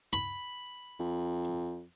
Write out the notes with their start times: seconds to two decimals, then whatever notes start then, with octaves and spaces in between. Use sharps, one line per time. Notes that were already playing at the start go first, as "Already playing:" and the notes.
0.13 B5
0.99 F2